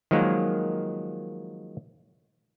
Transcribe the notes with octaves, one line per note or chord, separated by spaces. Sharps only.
D#3 F3 F#3 G#3 A#3